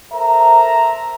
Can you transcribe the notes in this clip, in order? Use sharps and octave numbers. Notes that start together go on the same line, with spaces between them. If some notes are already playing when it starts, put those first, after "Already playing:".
A4 A#4 C5 E5 A#5